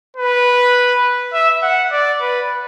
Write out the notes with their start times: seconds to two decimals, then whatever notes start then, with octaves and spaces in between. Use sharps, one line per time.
0.17 B4
1.33 E5
1.63 F#5
1.92 D5
2.21 B4